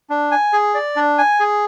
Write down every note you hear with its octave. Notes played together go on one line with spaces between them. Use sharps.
D4
G#5
G#4
D5
D4
G#5
G#4